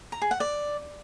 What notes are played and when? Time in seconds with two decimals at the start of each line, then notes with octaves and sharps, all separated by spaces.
0.12 A#5
0.22 G#4
0.31 F#5
0.40 D5